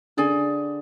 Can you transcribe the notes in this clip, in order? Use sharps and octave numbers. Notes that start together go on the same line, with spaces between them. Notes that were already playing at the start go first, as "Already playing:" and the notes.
D3 G#4 D5 G#5